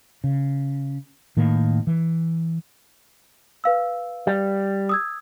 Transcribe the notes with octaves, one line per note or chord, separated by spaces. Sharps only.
C#3
A2 D#3 A#3
E3
B4 F5 E6
G3
D#6 E6 G#6